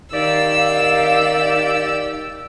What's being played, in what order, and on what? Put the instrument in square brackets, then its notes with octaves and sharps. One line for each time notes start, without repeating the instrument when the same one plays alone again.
[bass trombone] D#3 [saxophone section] G4 D5 [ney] F5 [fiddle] E6